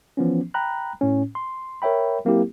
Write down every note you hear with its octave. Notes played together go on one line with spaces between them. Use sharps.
E3 F3 B3 C#4
G5 A#5 B5 F#6
A2 C#4
C6
A#4 C#5 E5 G5 B5
F#3 A#3 C4 E4 G4